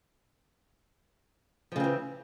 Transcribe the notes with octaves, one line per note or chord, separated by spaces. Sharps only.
C#3 E3 F3 C4